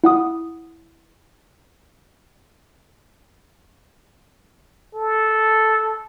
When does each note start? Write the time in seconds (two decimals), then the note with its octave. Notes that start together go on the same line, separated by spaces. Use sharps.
0.04 E4 F#5 D#6
4.95 A4